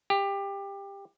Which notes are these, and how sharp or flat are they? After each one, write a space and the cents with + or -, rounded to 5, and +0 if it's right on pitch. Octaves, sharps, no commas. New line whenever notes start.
G4 +20